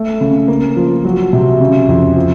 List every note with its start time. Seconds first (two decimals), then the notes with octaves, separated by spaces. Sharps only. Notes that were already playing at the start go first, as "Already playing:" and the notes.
Already playing: A3
0.21 C#3
0.48 A#3
0.76 F3
1.05 F#3
1.33 C3
1.61 C#3
1.89 F2
2.16 F3